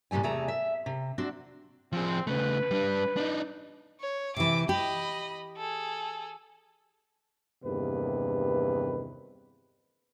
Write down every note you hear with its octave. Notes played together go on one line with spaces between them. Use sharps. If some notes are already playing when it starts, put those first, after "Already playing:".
A2 C3 G3 A3 G#5
E2 C3 A3 G#4 E5 A#5
E5
C3
C4 D4 F#4
F3 C4 G#4
C#3 A3 B4
G3 D4
D4 D#4
C#5
C3 E3 D6
G4 D#5 B5
G#4 A4
E2 G2 C3 D#3 A#3 B4